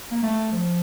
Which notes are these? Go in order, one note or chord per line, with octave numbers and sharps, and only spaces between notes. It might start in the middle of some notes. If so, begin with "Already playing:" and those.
A#3
A3
F3